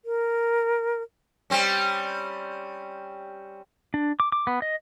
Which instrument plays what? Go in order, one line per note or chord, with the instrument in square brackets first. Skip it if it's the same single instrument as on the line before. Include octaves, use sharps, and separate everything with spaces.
[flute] A#4
[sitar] G3 C4 C#4
[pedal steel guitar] D4
D6
D6
B3
D#5